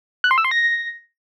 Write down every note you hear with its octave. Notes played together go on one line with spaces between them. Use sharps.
F#6
C6
E6
C6
A#6